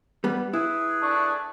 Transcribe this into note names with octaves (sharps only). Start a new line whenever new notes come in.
G3 B3
E4 G#4 B4
A3 D4 C#6